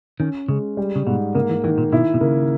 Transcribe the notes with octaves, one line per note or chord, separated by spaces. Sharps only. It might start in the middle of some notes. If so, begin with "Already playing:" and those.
D#3 C#4
C#3 G#3
G3
C#3
G#2 B2
C#3 A#3
E3
D#3 E3
A#2
B2 E4
B2
C#3 A#3